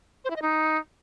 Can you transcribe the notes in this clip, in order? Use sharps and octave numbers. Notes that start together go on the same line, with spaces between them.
C5
E4
D#5
D#4